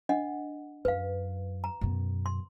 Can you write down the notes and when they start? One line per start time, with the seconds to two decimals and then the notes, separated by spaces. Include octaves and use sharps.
0.09 D4 D#5 F#5
0.85 F#2 B4 F5
1.64 A#5
1.81 F#2 B2
2.26 C6